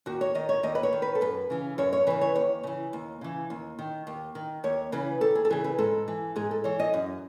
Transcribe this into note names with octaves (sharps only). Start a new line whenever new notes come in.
D#2 F#4
C#5
D#3 D#5
C#5
D#2 D#5
B4
C#5
D#3
B4
A4
F#2 B4
C#3 E3
F#2 C#5
C#5
C#3 E3 B4
C#5
D#2 C#5
C#3 E3
D#2
C#3 E3
D#2
D#3
D#2
D#3
D#2 C#5
C#3 E3 B4
D#2 A4
G#4
A4
C#3 E3 G#4
B4
G#2 A4
E3
G#2 G#4
A4
E3 C#5
D#5
F#2